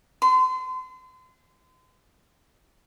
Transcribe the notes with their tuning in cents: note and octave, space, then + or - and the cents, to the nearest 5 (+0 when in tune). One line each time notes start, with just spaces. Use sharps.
C6 -35